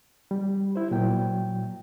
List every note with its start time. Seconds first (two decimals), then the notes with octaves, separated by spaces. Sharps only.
0.31 G3
0.76 E4 C5
0.91 A#2 F#3 G5